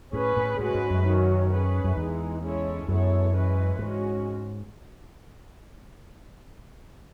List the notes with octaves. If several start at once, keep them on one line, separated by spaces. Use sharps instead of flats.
A2 C#4 G#4 B4
A2
A2 G#3 C#4 F#4 B4
G#2
F#2
D#3 F#3 C#4
C#4 G#4 B4
F#2
E2 E3 G#3 D#4
G#3 C#4 E4 A4 C#5
F#2 G#3 B3 E4 A4 C#5
E3 G#3 C#4 E4 B4
G#2 G#3 C#4 F#4